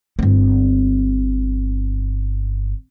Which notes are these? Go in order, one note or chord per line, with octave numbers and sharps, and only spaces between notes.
G1 C4